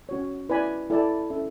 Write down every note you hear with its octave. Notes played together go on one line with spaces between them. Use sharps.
C#4 F#4 C#5
E4 B4 D5 G#5 B5
E4 A4 D5 A5
C#4 E4 A4 E5